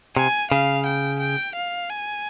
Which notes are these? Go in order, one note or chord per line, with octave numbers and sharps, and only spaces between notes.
C3 G#5
C#3 F5
G5
G5
F5
G#5